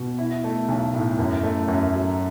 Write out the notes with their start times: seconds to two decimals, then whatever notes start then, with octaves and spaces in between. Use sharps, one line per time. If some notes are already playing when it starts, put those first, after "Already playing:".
Already playing: B2
0.18 E4
0.44 A3
0.68 B1
0.94 A2
1.19 F#2
1.43 A3
1.68 F#2
1.93 F#3